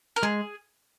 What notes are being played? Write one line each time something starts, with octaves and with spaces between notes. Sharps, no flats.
A#4
G#3 G#4